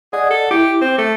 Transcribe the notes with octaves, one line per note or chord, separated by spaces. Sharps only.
G#4 D5 D#5 F#5
A4
E4 G4
C4 D6
A3